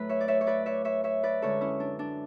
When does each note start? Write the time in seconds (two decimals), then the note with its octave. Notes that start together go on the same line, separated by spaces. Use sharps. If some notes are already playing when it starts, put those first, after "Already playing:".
Already playing: A2 F#3 A3 B4
0.09 C#5 E5
0.21 D5
0.28 C#5 E5
0.41 C#5
0.47 B4 D5
0.66 C#5 E5
0.85 C#5 E5
1.04 C#5 E5
1.23 B4 D5
1.42 F#2 D3 G#3 A4 C#5
1.61 C#4 E4
1.80 D4
1.99 D4